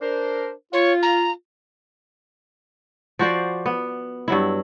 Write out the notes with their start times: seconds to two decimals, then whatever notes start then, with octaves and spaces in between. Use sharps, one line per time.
0.02 D4 A#4 C5
0.73 F4 C#5
1.03 A#5
3.19 F3 F#4 C5 D5
3.66 B3
4.28 G2 F#3 E4